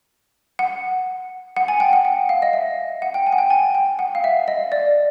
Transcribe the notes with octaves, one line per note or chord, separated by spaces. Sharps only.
F#5
F#5
G#5
G5
F#5
F#5
F5
D#5
E5
F#5
G5
G#5
F#5
G5
G#5
G5
F#5
F5
E5
D#5
D5